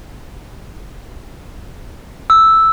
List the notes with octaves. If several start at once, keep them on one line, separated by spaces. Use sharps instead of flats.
E6